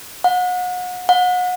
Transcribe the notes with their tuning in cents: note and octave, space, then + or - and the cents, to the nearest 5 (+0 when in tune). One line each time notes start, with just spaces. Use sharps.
F#5 -35
F#5 -35